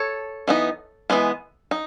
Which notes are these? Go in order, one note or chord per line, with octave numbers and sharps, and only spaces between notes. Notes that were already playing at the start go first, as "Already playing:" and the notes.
Already playing: A4 C#5
E3 B3 D#4
E3 G#3 B3
D#4